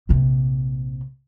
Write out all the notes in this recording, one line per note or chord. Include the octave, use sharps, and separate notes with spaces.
A#1 C3